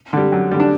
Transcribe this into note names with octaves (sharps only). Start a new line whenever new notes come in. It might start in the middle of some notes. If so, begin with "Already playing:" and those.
D3 G3
F#2
D3 G3
D4